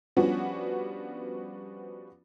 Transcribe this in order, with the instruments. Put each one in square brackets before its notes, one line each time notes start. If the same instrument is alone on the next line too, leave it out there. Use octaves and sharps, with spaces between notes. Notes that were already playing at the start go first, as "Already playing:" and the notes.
[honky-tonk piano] F3 G3 B3 C#4 D4 F#4